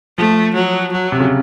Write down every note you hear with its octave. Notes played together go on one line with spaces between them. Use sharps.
F3 A3
F#3
F#3
C3
C#3